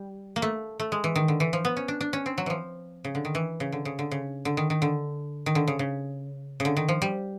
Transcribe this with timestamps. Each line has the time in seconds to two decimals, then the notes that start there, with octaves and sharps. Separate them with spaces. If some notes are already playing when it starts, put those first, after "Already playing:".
Already playing: G3
0.36 A#3
0.42 A3
0.80 A3
0.92 G#3
1.04 E3
1.16 D#3
1.28 D3
1.40 E3
1.53 F3
1.65 B3
1.77 C#4
1.88 D4
2.01 D4
2.13 C#4
2.26 C4
2.38 F#3
2.46 E3 F3
3.04 C#3
3.15 D3
3.25 D#3
3.35 E3
3.60 C#3
3.72 D3
3.85 C#3
3.99 D3
4.11 C#3
4.45 D3
4.57 D#3
4.70 D#3
4.82 D3
5.46 D#3
5.55 D3
5.68 C#3
5.79 C#3
6.60 C#3
6.65 D3
6.77 D#3
6.88 F3
7.02 G3